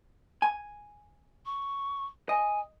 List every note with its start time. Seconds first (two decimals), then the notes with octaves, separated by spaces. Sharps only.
0.42 G#5
1.45 C#6
2.29 D#5 G#5